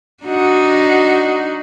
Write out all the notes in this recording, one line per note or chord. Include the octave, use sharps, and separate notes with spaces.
D4 D#4 F#4